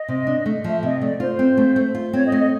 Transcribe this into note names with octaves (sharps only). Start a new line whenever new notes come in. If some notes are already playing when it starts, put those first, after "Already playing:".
Already playing: D#5
C3
D4
A3
F3 E5
C3 D#5
A3 D5
F4 C5
C4
A3
A3
F4
C4 C#5
D#5
A3
D#5